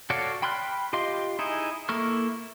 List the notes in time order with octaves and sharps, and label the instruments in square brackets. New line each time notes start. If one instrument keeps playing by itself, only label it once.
[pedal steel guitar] F#4 A4 C#5 D5 F5
G5 B5 C6 F6 F#6
F4 G4 D#5 F5 C6
D#4 E4 G#4
A#3 E4 A4 C#6 F6